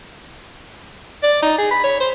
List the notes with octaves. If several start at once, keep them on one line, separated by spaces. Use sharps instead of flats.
D5
D#4
G#4
B5
C#5
C5